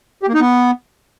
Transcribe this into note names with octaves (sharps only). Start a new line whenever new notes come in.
G4
A#3
D#4
B3